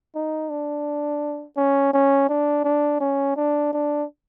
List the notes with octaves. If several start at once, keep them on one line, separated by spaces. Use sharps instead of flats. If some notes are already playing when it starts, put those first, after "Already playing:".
D#4
D4
C#4
C#4
D4
D4
C#4
D4
D4